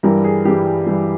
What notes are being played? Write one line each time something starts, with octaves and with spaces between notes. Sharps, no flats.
G2 E3 G3 A#4
G#4
G2 E3 G3 G4
G2 E3 G3